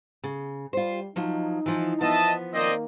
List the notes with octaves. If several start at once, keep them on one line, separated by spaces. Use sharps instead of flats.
C#3
G3 F4 C5
F3 F#3 D#4
E3 F3
F3 B3 D#5 E5 A5
D#3 A#3 C4 D5 D#5